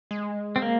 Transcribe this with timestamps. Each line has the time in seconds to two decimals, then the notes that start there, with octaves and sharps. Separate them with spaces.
0.11 G#3
0.56 C4
0.62 A#3